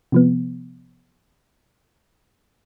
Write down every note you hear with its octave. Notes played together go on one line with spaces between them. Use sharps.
C3 F3 B3